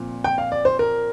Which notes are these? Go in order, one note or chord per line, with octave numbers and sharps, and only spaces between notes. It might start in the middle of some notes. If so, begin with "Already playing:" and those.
Already playing: A#2 F3 C4
G5
F5
D5
C5
A#4